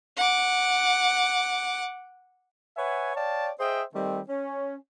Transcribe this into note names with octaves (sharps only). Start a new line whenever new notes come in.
F#5 D6
B4 C#5 E5 F#5 G#5
C#5 D5 F5 G5 A5
G#4 C5 D#5 E5 G5
D#3 G3 A3 C4
C#4